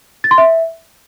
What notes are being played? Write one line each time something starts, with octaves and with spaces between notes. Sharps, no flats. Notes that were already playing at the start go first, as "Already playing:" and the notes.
A6
C6
E5